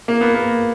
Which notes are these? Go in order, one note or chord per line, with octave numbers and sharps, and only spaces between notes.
A#3
B3
A#3